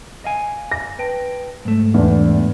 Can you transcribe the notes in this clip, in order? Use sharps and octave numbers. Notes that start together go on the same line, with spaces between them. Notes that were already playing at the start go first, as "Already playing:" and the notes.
D#5 F5 G#5
A#6
B4 G5 A5
G#2 A3
E2 G2 D4